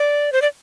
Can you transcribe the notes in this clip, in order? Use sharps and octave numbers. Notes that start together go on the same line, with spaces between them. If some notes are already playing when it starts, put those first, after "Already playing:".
Already playing: D5
C5
D5